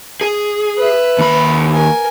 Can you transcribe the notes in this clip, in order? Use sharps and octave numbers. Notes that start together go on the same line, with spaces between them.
G#4
B4 E5
D#2 B5
A#4 G#5